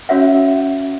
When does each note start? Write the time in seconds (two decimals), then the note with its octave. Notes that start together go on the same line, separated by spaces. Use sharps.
0.09 C#4 F#4 C#5 E5 F#5